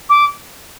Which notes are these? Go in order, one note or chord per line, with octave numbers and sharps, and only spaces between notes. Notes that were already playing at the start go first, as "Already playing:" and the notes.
D6